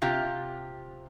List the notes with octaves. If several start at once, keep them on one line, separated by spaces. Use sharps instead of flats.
C3 F4 G4